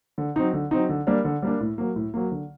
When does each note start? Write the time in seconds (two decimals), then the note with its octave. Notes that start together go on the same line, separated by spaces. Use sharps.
0.18 D3
0.36 F#3 C4 D#4
0.53 D3
0.71 F#3 C4 D#4
0.89 D3
1.07 G3 A#3 D4
1.25 D3
1.42 G3 A#3 D4
1.60 A2
1.78 F#3 A#3
1.96 A2
2.14 F#3 A#3
2.32 D3